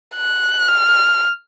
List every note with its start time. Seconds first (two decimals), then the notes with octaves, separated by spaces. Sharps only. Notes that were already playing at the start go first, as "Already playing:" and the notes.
0.16 F#6
0.68 F6